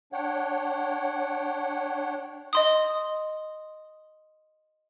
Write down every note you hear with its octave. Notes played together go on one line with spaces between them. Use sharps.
D4 C#5 F#5 G5
D#5 C6 D#6